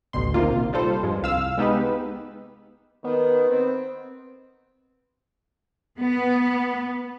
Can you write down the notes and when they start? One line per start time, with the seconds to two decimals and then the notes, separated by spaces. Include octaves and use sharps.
0.13 A1 D2 B2 C6
0.34 A#1 C3 D#3 A#3 F4
0.73 G3 F4 A4 C5
1.03 G2 F3 G#3
1.22 C2 F5 E6
1.58 G#3 B3 D#4 G4 B4
3.04 D#3 B3
3.49 C4
5.98 B3